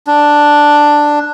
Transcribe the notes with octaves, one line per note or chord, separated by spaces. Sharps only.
D4